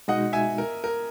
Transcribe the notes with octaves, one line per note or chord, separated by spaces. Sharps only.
B2 G#3 D#4 F#4 D#5 F#5
E5 G#5
A#4
A#4